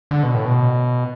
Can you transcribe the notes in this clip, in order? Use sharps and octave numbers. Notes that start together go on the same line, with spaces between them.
D3
B2
A2
B2